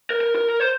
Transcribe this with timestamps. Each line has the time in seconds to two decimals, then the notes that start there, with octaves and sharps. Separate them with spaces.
0.10 A#4
0.21 A#4
0.36 A#4
0.50 A#4
0.60 C5